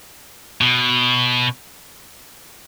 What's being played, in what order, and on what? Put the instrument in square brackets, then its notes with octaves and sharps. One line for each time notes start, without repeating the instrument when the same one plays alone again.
[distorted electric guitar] B2